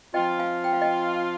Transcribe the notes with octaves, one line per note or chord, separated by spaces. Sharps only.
F3 C4 F4 D#5 G5
F5 G#5
G5
F5
D#5 G5